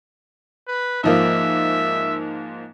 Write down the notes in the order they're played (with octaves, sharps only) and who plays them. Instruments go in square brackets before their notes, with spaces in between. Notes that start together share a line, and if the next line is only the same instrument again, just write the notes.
[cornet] B4
[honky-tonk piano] G#2 F3 A#3 [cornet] E5